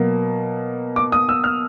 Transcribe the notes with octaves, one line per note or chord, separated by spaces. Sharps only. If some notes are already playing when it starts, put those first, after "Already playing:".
Already playing: B2 F#3 A#3
D6
D#6
E6
F6